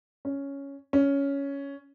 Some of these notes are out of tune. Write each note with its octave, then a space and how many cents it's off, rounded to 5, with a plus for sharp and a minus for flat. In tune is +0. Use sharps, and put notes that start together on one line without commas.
C#4 +5
C#4 +10